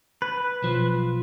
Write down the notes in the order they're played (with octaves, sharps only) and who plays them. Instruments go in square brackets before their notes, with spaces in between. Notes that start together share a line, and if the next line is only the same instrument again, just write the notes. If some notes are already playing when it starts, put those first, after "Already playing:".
[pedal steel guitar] B4
[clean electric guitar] B1 F3